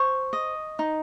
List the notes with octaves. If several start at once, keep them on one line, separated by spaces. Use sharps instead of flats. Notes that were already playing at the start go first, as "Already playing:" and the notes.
Already playing: C5 C#6
D#5
D#4